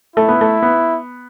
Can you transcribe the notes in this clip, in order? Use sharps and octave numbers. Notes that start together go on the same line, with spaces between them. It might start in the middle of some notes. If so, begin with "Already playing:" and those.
A3 E4
B3
A3
B3